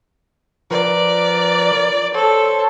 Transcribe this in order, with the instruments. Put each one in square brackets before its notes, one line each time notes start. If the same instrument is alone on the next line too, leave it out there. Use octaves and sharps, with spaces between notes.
[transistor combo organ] F3 A#4 B4 [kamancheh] D5
[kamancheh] A4 [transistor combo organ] C5 C#5